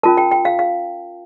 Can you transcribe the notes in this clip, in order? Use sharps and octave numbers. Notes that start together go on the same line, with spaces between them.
C#4 F4 A#4 A5
G5
G5
F5
F5